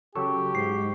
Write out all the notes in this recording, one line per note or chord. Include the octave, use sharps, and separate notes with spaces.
C#3 F#3 G4 A4 C#6
G#2 C7